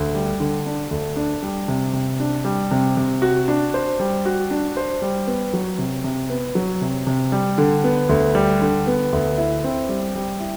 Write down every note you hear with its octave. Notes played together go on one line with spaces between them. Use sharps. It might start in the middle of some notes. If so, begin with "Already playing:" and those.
Already playing: D2
G3
D3
D4
D2
D4
G3
C3
C3
D4
G3
C3
C3
F#4
D4
C5
G3
F#4
D4
C5
G3
B3
F#3
C3
C3
B3
F#3
C3
C3
G3
D3
B3
D2
G3
D3
B3
D2
E4
C4
G3
G3
E4